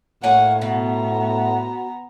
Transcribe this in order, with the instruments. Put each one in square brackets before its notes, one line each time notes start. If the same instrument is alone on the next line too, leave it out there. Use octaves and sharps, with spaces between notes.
[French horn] A2 [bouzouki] A#3 C#5 G#5 [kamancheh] F#5
[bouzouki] B2 [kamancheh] B3 A#5